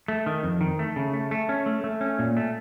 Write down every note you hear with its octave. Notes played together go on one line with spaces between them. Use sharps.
A3
D#3
F2
D#3
A3
C#3
A3
A3
C#4
A3
A3
C#4
A#2
A3